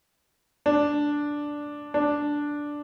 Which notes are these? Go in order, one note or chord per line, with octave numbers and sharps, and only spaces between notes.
D4
D4